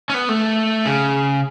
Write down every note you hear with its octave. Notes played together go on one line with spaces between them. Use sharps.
C#4
B3
A3
C#3